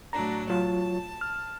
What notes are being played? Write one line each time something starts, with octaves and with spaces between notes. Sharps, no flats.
A2 F#3 D4 A#5
F#3 F4 C#5 A5
F6